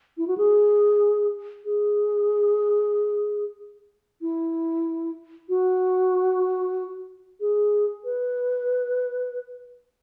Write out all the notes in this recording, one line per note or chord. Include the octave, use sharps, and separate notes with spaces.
E4
F#4
G#4
G#4
E4
F#4
G#4
B4